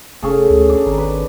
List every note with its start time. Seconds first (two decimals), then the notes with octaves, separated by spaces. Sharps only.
0.22 F1 C#4 G#4 A4
0.50 D2
0.69 D4
0.86 G#1 A#4
0.98 B4